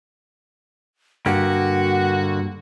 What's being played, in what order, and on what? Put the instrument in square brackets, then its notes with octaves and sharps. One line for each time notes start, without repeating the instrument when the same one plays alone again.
[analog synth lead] G2 [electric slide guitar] D3 A#3 G4 [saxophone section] F#4 [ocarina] F#5